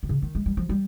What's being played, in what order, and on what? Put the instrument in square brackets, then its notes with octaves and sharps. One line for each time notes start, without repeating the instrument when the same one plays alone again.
[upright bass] D#3
C#3
D#3
G#3
G3
F3
G3